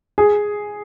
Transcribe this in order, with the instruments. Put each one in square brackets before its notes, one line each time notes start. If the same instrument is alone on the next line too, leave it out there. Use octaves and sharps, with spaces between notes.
[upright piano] G#4